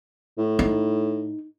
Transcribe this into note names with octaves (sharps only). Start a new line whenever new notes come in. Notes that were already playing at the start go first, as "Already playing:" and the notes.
A2
D#4